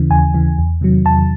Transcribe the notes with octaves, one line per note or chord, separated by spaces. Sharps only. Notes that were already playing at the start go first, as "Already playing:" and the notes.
Already playing: D#2 C#3 E3
D#2 G#5
C#3 E3
E2
C3 D#3 F#3
E2 A5